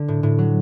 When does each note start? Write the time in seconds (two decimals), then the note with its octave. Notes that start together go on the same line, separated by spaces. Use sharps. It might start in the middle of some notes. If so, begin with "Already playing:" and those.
Already playing: D3
0.08 A2
0.23 A2
0.38 F#3